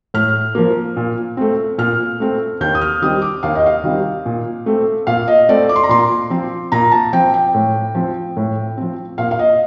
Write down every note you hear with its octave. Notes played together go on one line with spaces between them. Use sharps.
A2 F6
F3 A#3
A#2
A3 C4
A#2 F6
A3 C4
D#2 G6
D#6
F6
D#3 G3 C4 D#6
D6
D#2 F5
D#5
F5
D#3 G3 C4
A#2
A3 C4
A#2 F5
D#5
A3 C4 D5
D6
C6
A#5
A#2 C6
F3 C4
A#2 A#5
A5
F3 C4 G5
G5
A2
F3 C4
A2
F3 C4
A#2 F5
F5
D#5